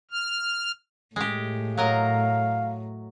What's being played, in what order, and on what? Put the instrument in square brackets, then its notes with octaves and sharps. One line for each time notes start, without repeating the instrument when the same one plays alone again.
[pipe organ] F6
[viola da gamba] A2 [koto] G#3 G4
[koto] F#3 A#4 D#5 [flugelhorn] F5